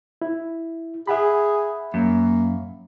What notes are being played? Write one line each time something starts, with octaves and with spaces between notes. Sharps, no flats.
E4
G#4 E5 F#5 B5
F#2 A#3